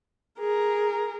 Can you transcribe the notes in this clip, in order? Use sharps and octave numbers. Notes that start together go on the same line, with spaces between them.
G#4 A#4